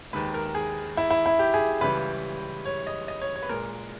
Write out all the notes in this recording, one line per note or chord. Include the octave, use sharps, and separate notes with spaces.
D#2 D#3 G#3 B4
A#4
G#4
E4
E4
E4
G4
G#4
C#2 C#3 E3 G3 B4
C#5
D#5
D#5
C#5
C#5
B4
A#2 G#3 A#4